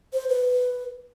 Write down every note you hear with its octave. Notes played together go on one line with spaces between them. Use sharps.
C5
B4